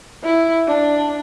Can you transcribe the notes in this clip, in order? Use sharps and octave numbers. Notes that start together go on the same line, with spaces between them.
E4
D4